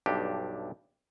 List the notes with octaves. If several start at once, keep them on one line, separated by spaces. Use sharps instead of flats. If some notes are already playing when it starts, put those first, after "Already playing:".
B1 G2 D4 G4